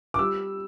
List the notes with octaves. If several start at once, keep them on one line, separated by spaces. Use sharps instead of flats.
D6
G3 E6